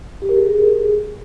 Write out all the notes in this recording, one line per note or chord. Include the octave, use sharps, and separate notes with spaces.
G4
A#4
G#4